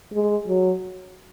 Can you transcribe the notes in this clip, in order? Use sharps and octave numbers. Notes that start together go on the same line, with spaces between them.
G#3
F#3